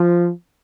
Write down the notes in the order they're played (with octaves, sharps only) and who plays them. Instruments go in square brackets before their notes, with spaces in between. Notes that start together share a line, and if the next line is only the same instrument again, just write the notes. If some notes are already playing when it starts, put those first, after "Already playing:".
Already playing: [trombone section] F3